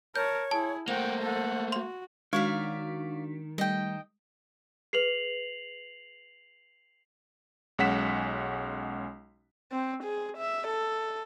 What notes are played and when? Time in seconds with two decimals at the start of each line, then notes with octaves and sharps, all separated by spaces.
0.16 A#4 C#5 A5 G6
0.51 E4 G#4 A5
0.88 A3 A#3 C5 F#5 G5 F7
1.22 A4 F#5
1.72 F#4 C6 F7
2.33 D#3 G#3 D4 F#4 C#5 D5 F5 B6
3.58 G3 A3 D#5 G5
4.93 G#4 B4 C7 F7 F#7
7.79 B1 G#3 C#4 F#5 B6 E7
9.72 C4
10.04 G#4
10.38 E5
10.67 A4